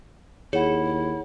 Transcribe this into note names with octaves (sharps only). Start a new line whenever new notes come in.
D#2 E4 G#4 C#5 F#5